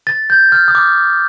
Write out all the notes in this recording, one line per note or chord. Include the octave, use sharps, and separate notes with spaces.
A6
G6
F6
D#6
D6